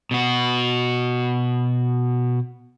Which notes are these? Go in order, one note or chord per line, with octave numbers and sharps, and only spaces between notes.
B2 F#4